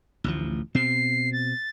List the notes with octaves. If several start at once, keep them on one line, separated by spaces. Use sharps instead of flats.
A1 D2 F3
B2 C4 C7
A6